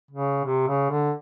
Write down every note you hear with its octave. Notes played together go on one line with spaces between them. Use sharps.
C#3
C3
C#3
D3